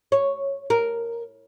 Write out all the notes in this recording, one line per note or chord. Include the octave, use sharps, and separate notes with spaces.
C#5
A#4